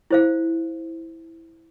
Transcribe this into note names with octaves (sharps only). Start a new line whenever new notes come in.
E4 C5 F5